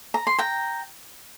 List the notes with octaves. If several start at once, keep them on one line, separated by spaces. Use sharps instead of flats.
A#5
C6
G5 A#5